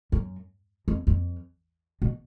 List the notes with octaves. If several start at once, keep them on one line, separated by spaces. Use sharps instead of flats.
F#2
F2
F2
B2